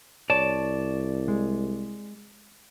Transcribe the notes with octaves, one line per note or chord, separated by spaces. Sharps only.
C2 C#5 D5 A5
G#3